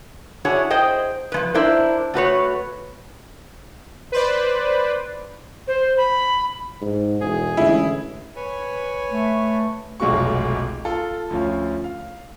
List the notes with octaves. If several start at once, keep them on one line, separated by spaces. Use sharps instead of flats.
D4 E4 F#4 G#4 C#5
G#4 C5 D#5 G5
F3 G#3 B4
D4 E4 A#4 C5
A3 F#4 B4 C#5
B4 C5 D5
C5
B5
G#2
E1 G#4
A1 D3 G#3 C#4 E4
B4 C#5 G#5
A3
F1 B1 G#3 F4 F#4 C#6
F4 A4
D2 F3 C#4 F4
F5